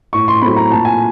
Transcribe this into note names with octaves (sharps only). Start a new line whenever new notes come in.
A2 C#6
C6
F#3 A3 C4 B5
A#5
A#2 A5
G#5